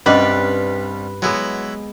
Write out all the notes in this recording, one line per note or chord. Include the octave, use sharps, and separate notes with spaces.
C2 G2 G3 C#4 B4 D5 D#5
F#3 G#3 B3 E4